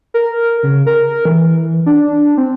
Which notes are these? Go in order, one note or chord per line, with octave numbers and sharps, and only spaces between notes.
A#4
C#3
A#4
E3
D4
C4